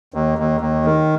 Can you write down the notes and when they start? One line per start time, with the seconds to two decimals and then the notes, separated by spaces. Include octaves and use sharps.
0.14 D#2
0.38 D#2
0.61 D#2
0.85 D#3